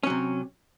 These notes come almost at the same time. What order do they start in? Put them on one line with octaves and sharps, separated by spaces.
C#4 F#3 C3